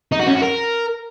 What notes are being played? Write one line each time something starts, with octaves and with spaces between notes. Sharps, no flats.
D#4
F#4
C#4
F#4
A#4